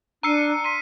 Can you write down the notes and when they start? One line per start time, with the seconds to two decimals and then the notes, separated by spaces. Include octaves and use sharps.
0.23 D4 A#5 E6 F6 C7 C#7 D#7
0.64 C6 B6 C7 D#7